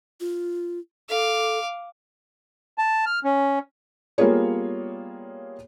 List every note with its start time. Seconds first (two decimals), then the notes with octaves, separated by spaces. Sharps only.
0.20 F4
1.10 A4 F5 D6
2.78 A5
3.06 F6
3.24 C#4
4.18 G3 A#3 B3 F4 G#4 C#5